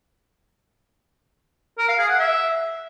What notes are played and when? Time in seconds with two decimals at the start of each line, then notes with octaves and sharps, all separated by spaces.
1.78 A#4
1.88 F5
1.99 G#4
2.09 F#5
2.19 E5